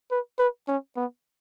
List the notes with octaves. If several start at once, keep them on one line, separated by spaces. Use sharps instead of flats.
B4
B4
C#4
B3